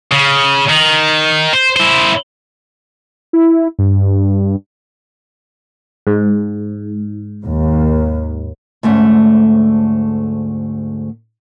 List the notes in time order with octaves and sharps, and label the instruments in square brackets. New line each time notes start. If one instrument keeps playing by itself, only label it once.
[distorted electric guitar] C#3
D#3
C5
E4 C5
[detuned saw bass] E4
G2
[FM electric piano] G#2
[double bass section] D#2
[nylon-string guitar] D2 G#2 A3 C#4